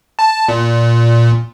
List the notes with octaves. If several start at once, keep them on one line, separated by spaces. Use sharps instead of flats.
A5
A#2